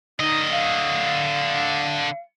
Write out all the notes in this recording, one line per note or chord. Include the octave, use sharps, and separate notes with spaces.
D3 D#4 D#5
F5